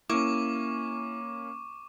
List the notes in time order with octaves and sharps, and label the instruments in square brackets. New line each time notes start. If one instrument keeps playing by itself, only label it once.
[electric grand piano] A#3 C#4 [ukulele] E4 [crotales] C#6 D6